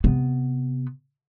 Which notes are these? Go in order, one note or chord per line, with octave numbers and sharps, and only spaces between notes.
C3 B3